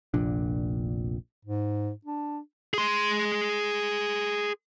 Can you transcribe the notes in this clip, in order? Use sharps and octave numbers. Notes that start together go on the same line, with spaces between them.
F1 A#1 A#2 D4
G#2
D4
G#4 C6